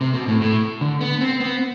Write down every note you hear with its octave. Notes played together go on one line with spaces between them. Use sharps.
C3
B2
A2
A2
D3
B3
C4
B3